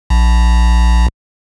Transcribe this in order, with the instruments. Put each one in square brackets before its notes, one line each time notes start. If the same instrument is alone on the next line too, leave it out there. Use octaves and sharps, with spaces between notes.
[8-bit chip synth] A#1